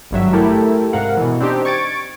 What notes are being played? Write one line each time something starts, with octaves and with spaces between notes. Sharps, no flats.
G#1 G2 F#3 E5
A3 E4 G4 A4 A#4
G#2 C3 A#4 F5 F#5
B2 E3
C4 D4 D#4 G4
C#6 G#6 A6 D7